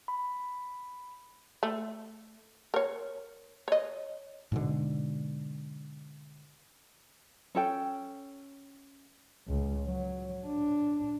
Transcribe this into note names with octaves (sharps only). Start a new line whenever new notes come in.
B5
A3
A#4 C#5
C#5 D#5
G#2 B2 D3
C#4 A4 G5
C#2
F#3
D4